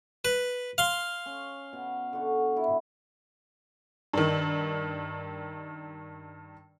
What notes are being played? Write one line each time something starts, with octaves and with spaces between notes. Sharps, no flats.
B4
F5 C6
C#4
B2
D3 F#4
E4 A4
G2 D#3